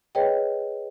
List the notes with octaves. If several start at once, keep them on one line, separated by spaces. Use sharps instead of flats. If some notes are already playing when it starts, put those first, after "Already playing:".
G#4 B4 C#5 D#5 G5